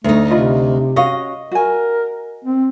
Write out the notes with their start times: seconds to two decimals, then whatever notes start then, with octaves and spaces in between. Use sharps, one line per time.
0.04 D2 A3 D#4
0.30 C3 F4 D#5 B5
0.96 C#4 F#4 D#5 F5
1.51 F#4 A#4 G#5
2.45 C4